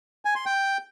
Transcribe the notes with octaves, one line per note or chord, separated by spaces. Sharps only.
G#5
C6
G5